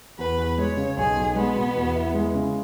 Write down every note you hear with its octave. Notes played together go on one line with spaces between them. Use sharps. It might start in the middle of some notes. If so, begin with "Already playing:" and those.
E2 B4
E2
G#3 C#5
C#3
B1 G#4
B1
G#3 B3
B2
E2
E4
G#3
C#3